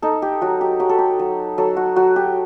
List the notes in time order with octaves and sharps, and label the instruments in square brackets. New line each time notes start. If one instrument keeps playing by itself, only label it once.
[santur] D#4 A4
G4
F#3 F#4
G4
F#3 G4
A4
G4
F#3
F#3 A4
F#4
F#3 F#4
G4